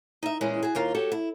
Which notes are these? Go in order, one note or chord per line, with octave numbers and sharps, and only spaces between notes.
D#4 E5
A#2 E3 G#3 C#4 E4 G#4
F#4 G#4
D#2 A#3 F4
F#4 G4 A4 C#5 F#5
E4